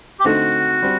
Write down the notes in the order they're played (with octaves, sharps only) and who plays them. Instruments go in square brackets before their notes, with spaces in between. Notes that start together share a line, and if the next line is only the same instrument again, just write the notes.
[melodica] G4
[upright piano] D3 A3 C4 D#4 [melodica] F#4
[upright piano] G3 C4